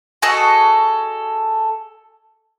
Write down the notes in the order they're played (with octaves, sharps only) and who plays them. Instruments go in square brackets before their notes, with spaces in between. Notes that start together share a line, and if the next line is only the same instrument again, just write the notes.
[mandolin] F#4 G#4 A4 D#5